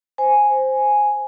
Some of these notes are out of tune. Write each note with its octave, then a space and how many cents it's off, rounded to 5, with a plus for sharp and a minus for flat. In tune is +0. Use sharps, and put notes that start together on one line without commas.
C5 +0 G#5 +0